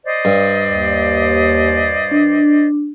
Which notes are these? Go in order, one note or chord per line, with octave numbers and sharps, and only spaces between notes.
C5 D5 D#5
G2
D#2
D4